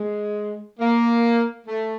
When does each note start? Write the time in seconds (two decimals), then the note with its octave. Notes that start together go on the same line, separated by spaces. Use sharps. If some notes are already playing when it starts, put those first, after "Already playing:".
Already playing: G#3
0.80 A#3
1.67 A3